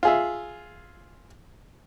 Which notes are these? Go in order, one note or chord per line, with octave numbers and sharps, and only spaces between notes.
F4 G#4 E5